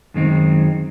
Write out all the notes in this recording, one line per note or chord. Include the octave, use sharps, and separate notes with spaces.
F#2 D#3 G#3 C4 D#4